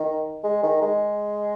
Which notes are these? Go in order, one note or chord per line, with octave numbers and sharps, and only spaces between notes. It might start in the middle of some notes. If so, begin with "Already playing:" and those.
Already playing: D#3
G#3
D#3
G#3